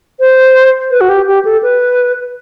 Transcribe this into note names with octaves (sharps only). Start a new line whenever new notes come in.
C5
B4
F#4
G4
G4
A4
B4